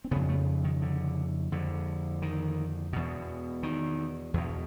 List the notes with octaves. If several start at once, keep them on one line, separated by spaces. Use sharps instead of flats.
C4
F2 C#3 B3
A3
D#3
D3
F2 D3
D#3
E2 B2
D#3
E2 B2